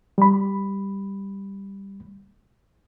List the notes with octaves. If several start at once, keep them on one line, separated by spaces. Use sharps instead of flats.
G3 B5